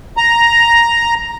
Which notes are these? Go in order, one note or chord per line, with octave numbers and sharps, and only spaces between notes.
A#5